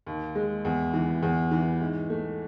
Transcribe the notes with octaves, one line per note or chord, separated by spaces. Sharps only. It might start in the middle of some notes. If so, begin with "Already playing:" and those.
D#2
G#3
E2
E3
E2
E3
G#2
A3